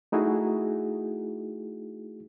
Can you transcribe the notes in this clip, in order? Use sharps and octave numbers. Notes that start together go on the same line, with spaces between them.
A3 D#4 E4 F#4 G#4